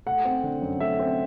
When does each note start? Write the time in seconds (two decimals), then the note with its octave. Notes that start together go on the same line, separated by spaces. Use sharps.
0.06 A3 F#5
0.25 C4
0.43 D3
0.62 F#2
0.80 A3 E5
0.99 C4